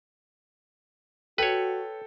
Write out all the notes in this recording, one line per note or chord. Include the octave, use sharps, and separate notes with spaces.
F#4 A4 B4 C#5 G5